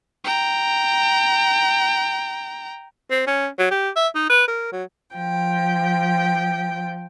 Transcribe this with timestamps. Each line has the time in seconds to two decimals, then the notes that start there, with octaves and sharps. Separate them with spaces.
0.25 G5 A#5
3.11 C4
3.27 C#4
3.59 F#3
3.71 G4
3.96 E5
4.15 D#4
4.30 B4
4.48 A#4
4.72 F#3
5.15 F3 G5